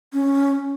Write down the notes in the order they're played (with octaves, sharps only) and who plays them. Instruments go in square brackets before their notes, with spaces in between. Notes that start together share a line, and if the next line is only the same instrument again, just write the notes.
[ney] C#4